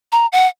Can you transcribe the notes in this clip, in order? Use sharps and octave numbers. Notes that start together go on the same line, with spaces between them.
A#5
F#5